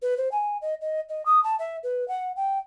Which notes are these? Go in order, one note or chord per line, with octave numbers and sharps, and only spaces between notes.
B4
C5
G#5
D#5
D#5
D#5
D#6
A5
E5
B4
F#5
G5